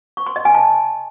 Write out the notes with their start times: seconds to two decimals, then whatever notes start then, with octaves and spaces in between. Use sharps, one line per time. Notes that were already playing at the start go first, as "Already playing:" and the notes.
0.17 C#6
0.27 C6
0.36 D#5
0.45 G#5
0.55 A5